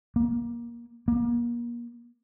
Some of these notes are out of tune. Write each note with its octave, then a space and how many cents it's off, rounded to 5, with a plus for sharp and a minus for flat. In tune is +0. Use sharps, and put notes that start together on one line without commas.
A#3 +20
A#3 +35